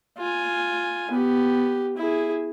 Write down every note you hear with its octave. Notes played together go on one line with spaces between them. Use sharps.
F4 G#5
B3 G4
E4 G#4